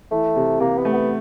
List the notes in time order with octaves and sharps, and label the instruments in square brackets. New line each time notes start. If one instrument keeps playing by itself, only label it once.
[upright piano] E3 [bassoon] A3
[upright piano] C3
[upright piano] C3 [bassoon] A#3
[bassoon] B3
[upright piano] A3
[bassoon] B3